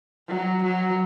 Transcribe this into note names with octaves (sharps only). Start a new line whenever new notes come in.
F#3
F#3